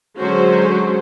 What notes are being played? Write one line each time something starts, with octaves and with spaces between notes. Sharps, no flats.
D3 F#3 G#3 C#4 F#4 C5